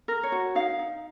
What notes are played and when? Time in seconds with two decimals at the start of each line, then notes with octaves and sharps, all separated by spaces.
0.08 A#4
0.23 C#5
0.32 F#4
0.55 D#4 F5
0.79 D#4